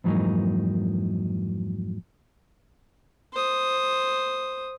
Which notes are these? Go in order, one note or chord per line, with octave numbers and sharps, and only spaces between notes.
F2 G#2 E3 F#3 A#3 D#4
C5 D#6